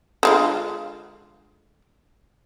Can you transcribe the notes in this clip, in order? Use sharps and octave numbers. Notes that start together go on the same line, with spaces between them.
D3 G#3 F4